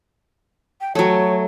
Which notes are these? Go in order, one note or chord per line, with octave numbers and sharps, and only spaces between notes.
G5
F#3 A3 C#5